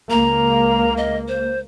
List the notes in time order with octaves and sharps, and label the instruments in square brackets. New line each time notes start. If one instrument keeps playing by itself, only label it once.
[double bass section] C#2 A#3 [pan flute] A#5
[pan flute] D#5
C5